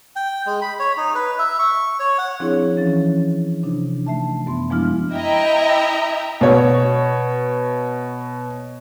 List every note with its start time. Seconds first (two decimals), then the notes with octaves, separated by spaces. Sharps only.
0.16 G5
0.46 G#3
0.62 B5
0.79 C#5
0.97 D#4
1.15 B4
1.39 E5
1.59 C#6
1.99 C#5
2.18 F#5
2.40 F3 C4 D4 E4 G#4 C#5
2.77 E3 F3 C#4 A6
3.63 C3 D4 D#4
4.06 A3 E5 A5
4.46 F#2 B3 C6
4.70 F3 G#3 B3 D4 E4 F6
5.13 E4 D#5 E5 G5 A#5
6.41 B2 C#5